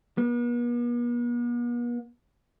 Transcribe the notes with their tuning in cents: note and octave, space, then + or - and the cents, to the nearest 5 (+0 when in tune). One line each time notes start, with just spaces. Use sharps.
B3 -45